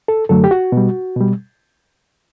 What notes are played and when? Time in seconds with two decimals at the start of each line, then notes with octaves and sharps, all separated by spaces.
0.08 A4
0.29 F#2 D3 F#3 A3 A4
0.44 G4
0.51 F#4
0.72 B2 G3
1.16 B2 G3